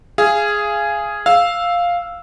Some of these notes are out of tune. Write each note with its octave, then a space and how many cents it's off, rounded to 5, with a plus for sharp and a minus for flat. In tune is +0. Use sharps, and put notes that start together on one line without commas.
G#4 +0 F5 -30
F5 +0 E6 +0